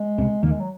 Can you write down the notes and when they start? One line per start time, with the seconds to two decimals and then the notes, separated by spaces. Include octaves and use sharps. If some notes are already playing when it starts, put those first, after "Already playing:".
Already playing: G#3
0.18 C2 C3
0.43 D#2 D#3 A#3
0.51 G#3
0.60 F#3